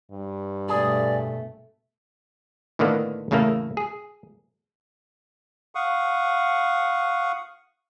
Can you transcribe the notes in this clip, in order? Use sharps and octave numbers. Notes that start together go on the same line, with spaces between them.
G2
B2 A3 G#4 D5
A2 D3 D#3 A#3 B3
E2 A2 C#3 A3 A#3
G#4
F5 F#5 C#6 D#6